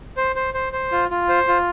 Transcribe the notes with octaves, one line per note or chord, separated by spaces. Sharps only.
C5
C5
C5
C5
F4
F4
C5
F4